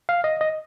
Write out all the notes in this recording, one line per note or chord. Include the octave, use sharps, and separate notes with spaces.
F5
D#5
D#5